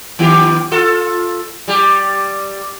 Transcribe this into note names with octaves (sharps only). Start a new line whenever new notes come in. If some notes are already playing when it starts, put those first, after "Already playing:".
D#3 B3 G4
F4 A4
G3 G4